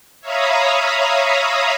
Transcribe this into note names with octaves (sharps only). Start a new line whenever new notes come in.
C#5 E5 F5 A#5 B5 D#6